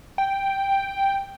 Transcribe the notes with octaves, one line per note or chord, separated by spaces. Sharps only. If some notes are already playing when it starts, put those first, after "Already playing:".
G5